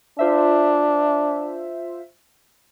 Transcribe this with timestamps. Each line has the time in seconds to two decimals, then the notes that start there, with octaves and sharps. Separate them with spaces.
0.19 D4 F4 C5 E5